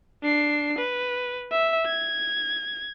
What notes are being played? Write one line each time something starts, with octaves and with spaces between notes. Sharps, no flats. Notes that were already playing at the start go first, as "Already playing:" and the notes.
D4 C7
B4
E5
G#6